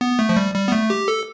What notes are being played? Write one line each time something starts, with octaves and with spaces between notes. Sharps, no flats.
B3
A3
F3
G3
G3
B3
A3
G4
A4